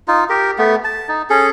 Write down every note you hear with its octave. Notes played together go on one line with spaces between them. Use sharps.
D#4 F4
G4 A#4
A3 B3
A5
D#4
C#4 G#4 A4